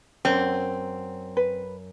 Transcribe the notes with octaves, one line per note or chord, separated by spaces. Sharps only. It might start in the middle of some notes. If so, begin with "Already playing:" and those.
F#2 C4
B4